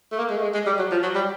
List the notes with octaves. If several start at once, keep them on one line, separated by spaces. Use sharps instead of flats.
A3
A#3
G#3
A3
G#3
G#3
G3
F#3
F3
F#3
G3